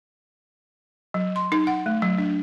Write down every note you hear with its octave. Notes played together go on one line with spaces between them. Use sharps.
F#3
C6
D#4
F#5
A3
F#3
D4